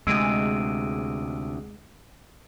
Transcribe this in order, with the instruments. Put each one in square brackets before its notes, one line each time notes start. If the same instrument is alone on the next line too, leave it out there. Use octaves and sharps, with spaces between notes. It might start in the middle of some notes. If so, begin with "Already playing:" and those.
[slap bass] D2 C3 [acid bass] G#3 [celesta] E6 D7 D#7